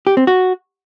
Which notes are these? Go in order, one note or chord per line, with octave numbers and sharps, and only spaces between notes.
G4
C4
F#4